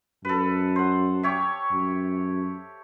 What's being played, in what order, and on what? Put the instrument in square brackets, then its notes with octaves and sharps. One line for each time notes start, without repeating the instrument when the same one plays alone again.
[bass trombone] F#2 [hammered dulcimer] A4 B4
[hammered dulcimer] C5 F#5
G4 C#5 E5
[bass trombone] F#2